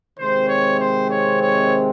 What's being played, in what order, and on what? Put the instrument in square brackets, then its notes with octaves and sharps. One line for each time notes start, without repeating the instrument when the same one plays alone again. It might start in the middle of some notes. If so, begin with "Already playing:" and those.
[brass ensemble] C3 D#3 G#3 C4 C5
C#5
C5
C#5
C#5